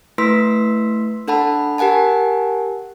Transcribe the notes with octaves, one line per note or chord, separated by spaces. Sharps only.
A3 E4 B4 C6 E6 B6
D4 A4 F#5 A5 B5
G4 A#4 F#5 G#5 A5